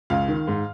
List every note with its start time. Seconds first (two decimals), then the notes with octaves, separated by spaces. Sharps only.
0.10 C#2 F5
0.28 D#3
0.47 G#2